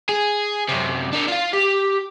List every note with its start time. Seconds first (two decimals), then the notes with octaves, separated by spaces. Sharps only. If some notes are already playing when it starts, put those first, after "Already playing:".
0.09 G#4
0.69 F#2 C3
1.13 D4 A#4
1.28 F4 F5
1.54 G4